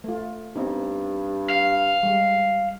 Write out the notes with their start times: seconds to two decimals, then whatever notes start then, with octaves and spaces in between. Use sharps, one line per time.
0.04 A3 F4
0.56 G2 B3 C4 D#4
1.50 F5
2.03 G3 G#3